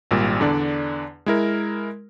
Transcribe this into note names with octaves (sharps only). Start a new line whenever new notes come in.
G#1 A#2 G3
E2 D3 D4 D5
G#3 E4 A#4